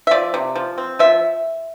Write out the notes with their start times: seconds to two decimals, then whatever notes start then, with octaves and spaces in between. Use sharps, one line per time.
0.07 E5
0.11 F3 D5
0.34 C3
0.55 F3
0.78 C4
0.99 F3 E5